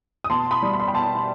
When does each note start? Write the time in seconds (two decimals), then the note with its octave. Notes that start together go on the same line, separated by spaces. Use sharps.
0.24 D#6
0.30 B2 A5 C6
0.51 B5 D#6
0.62 G3
0.73 B5
0.80 C6
0.87 G5 B5
0.94 B2 A5 C6